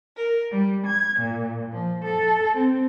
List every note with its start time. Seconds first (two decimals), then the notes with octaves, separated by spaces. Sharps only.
0.15 A#4
0.51 G3
0.85 G#6
1.19 A#2
1.73 F3
2.04 A4
2.56 C4